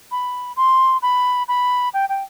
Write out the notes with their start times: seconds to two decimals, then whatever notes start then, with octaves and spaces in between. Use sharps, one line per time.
0.11 B5
0.56 C6
1.02 B5
1.48 B5
1.94 G5
2.09 G5